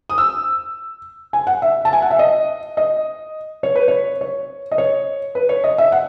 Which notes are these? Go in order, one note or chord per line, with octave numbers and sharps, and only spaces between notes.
D#6
E6
G#5
F#5
E5
A5
G#5
F#5
E5
D#5
D#5
C#5
B4
C#5
C#5
D#5
C#5
B4
C#5
D#5
E5
F#5